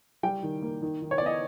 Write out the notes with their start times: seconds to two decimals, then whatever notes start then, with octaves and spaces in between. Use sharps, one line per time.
0.23 G3 G5
0.43 D#3
0.62 A#3
0.82 D#3
1.02 D#3
1.11 C#5
1.18 D5
1.21 B3 D#5